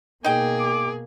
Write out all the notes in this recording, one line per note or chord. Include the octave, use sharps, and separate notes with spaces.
B2 A#3 D#4 G#4 G5
D6